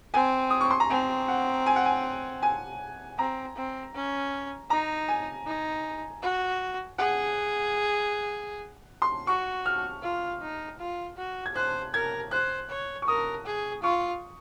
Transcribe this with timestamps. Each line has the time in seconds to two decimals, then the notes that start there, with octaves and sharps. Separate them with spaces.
0.14 C4 G#5
0.50 D#6
0.61 C#6
0.70 C6
0.80 A#5
0.90 C4 G#5
1.28 F#5
1.66 G#5
1.76 F#5
1.86 G#5
2.43 G#5
3.18 C4 A#5
3.56 C4
3.94 C#4
4.70 D#4 A#5
5.08 G#5
5.46 D#4
6.23 F#4
6.98 G#4 F#5
9.02 C6
9.27 F#4 C#6
9.66 F6
10.03 F4
10.42 D#4
10.80 F4
11.17 F#4
11.46 G#6
11.55 C5 F#6
11.93 A#4 G#6
12.31 C5 F#6
12.70 C#5
13.02 C#6
13.07 A#4 D#6
13.45 G#4
13.83 F4 C#6